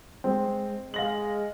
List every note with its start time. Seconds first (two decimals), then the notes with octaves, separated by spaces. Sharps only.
0.24 G#3 C4
0.94 G#3 F5 A#6 F#7